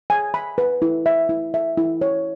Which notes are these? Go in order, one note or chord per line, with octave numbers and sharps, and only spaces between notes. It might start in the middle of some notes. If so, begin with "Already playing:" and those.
G#5
B5
B4
E4
E5
E4
E5
E4
C#5